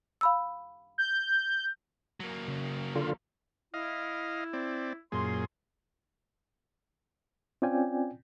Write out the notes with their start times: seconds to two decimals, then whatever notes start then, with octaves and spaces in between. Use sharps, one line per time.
0.21 F5 B5 E6
0.98 G6
2.20 F#3 A#3
2.48 C#3
2.96 D3 F4
3.74 E4 D#5 F5
4.53 C4 D5
5.12 F#2 A#2 G#4 C6
7.62 C4 C#4 F4 D5 G5 G#5